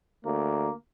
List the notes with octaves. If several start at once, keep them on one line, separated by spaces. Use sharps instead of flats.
D2 A#3